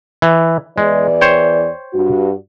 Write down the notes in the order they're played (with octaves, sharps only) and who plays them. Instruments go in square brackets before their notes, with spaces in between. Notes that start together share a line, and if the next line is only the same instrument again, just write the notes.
[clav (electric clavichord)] E3
[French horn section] E2 E3 D5 [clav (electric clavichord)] G#3
[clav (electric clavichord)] C5 C#5 G5
[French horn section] G2 F#4